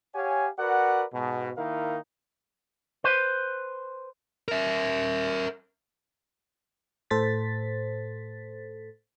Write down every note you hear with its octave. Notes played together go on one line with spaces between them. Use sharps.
G4 C#5 F5 F#5 G#5
F#4 A#4 B4 D5 F#5
G#2 B2
D#3 A#3 D#4 E4 A#4 F5
B4 C5
A#4 E5
A2 A4 C5 A6 B6